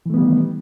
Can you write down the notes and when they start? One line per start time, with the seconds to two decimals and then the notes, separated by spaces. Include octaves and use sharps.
0.06 E3
0.10 A3
0.14 B3
0.18 G3
0.22 D#3